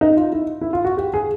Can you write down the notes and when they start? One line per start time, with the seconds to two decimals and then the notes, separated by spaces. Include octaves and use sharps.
0.01 D#4
0.17 F4
0.32 E4
0.61 E4
0.73 F4
0.85 F#4
0.97 G4
1.14 G#4